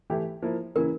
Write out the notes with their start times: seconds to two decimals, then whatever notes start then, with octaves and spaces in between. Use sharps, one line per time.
0.10 E3 A3 E4 G4
0.42 F3 A#3 E4
0.75 C#3 E3 A#3 E4 A#4